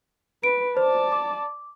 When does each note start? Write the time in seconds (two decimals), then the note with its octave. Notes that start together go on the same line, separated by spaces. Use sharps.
0.43 B4 D7
0.77 C5 D5 A5
1.12 D6